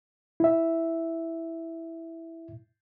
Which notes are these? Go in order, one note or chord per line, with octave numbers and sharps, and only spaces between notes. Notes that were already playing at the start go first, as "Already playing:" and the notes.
E4 E5